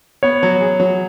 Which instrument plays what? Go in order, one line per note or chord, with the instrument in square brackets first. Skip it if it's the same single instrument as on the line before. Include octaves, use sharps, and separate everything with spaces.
[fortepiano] B3 [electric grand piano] C#5
[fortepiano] F#3
G#4
F#3